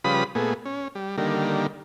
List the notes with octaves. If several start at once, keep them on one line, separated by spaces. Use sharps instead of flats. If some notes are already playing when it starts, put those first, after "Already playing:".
C#3 F3 G3 B4 B5 D#6
A#2 A3 B3 G#4
C#4
G3
D3 D#3 G3 A#3